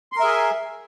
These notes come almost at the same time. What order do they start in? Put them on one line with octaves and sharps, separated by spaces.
C6 A#4 E5 G#4 G#5